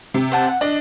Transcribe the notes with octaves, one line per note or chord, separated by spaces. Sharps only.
C3
C5 F#5 A5
F#5
D4 D#5